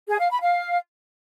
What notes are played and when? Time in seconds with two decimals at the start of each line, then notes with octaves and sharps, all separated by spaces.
0.09 G#4
0.19 F5
0.30 B5
0.41 F5